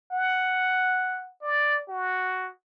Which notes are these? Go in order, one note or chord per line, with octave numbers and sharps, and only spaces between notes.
F#5
D5
F#4